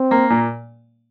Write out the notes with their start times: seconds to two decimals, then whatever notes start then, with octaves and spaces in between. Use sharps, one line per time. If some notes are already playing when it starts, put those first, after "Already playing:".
Already playing: C4
0.11 A#3
0.30 A#2